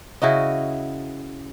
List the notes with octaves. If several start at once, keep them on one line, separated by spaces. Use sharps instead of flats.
C#3 E4 F#4 D#5